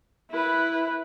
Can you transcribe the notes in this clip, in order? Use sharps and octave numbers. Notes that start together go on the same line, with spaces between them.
E4 B4